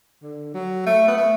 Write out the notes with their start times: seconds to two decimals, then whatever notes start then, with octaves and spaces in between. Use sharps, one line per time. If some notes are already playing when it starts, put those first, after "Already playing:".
0.23 D3
0.54 F#3
0.86 A3
1.08 B3
1.18 A3